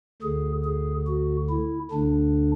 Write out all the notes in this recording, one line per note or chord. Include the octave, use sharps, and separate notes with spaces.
D2 D3 G#4
G#4
F#4
E4
D2 D3 D4